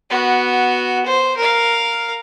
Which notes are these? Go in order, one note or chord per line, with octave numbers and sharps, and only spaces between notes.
B3 F#4
C5
A#4 F5